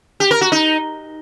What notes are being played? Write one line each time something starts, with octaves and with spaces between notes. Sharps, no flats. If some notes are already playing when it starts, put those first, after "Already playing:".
G4
A#4
F#4
D#4